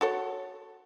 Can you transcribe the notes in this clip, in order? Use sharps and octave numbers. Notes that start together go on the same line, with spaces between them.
F#4 A4 C#5